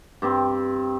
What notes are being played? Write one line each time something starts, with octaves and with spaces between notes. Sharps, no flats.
G2 C4